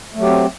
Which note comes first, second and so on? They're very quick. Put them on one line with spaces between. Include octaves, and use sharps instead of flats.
A3 F#3 G4 C4